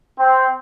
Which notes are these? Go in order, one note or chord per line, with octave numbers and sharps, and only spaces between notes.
C4